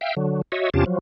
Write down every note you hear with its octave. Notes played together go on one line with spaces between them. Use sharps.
E5 F5 G5
D3 F#3
F#4 C#5 D#5 E5
E2 C3 C#4 F4 G4 A5
F3 F#3